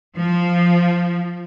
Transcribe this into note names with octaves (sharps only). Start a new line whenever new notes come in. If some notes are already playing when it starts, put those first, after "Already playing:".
F3